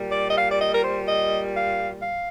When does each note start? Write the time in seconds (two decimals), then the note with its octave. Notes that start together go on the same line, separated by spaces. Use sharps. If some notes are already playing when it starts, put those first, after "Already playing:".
Already playing: A#2 G3
0.12 D5
0.28 D#5
0.35 F5
0.50 D5
0.59 D#5
0.73 A#4
0.82 C5
1.07 D#5
1.53 F5
2.01 F5